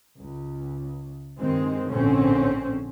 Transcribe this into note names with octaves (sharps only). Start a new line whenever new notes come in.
C#2
G2 D#3 G#3 C4
A#1 G#2 D3 C4 C#4